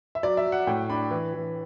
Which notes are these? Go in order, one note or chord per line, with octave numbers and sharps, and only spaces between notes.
E5
F#3 D5
E5
F#3
F#5
A2 G5
D4 B5
E3
E3